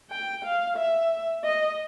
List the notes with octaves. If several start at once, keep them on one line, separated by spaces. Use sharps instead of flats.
G5
F5
E5
D#5